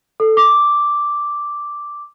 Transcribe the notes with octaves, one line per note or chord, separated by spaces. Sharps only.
A4
D6